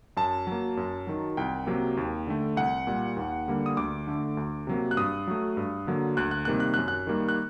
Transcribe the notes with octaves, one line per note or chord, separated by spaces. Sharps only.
F#2 A5
F#3 A#3
F#2
D#3 F#3
C2 G5
C3 F#3 A#3
D#2
D3 A3
C2 F#5
A#2 G3
D#2
D3 G3 A#3
D#6
D2 D6
D3 A3
D2
C3 F#3 A#3
F#6
G2 D#6
F#3 A3
G2
D3 F#3 A#3
D2 F#6
F#6
C3 D#3 G3 A#3 F#6
F#6
F#6
F#2
F#6
D#3 G3 A#3
F#6